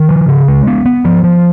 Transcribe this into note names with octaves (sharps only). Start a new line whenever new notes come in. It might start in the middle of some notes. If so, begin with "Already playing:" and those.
Already playing: D#3
F3
C#3
G#3
B3
B3
F3
F3